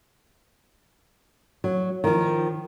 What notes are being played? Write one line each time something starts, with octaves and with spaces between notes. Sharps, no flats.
F#3
D#3 F3